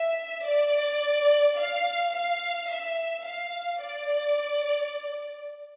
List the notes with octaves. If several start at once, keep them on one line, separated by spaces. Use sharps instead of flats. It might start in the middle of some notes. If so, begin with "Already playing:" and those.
Already playing: E5
D5
F5
F5
E5
F5
D5